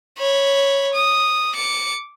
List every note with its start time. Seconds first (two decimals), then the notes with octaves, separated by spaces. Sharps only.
0.18 C#5 B5
0.94 D#6
1.54 D6 C#7